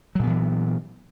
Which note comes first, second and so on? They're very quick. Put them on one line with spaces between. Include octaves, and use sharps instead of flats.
F#3 A#2 B3 E3